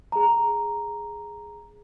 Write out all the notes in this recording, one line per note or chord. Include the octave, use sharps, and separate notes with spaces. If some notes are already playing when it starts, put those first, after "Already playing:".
G#4 A#5